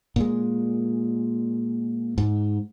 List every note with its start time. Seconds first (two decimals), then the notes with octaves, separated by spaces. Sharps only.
0.16 A#2 G#3
2.18 G#2